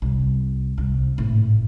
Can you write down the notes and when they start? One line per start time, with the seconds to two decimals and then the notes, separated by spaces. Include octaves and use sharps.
0.02 C2
0.78 C2
1.18 G#1 A2